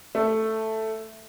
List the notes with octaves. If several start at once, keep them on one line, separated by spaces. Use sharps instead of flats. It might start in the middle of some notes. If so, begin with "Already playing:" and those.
A3